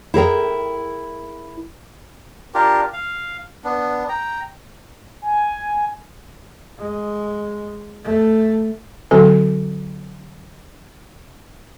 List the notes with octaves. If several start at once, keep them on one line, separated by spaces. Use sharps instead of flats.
E4 G#4 A#4 G5
D4 F4 G4 A#4
F5
B3 D4
G5 A#5
G#5
G#3
A3
D3 F#3 C4 F#4 A4 G#5